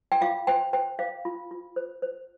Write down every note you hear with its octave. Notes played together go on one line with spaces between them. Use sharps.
G5
F4 F5
C5 G5
C5 G5
C5 F5
F4
F4
C5
C5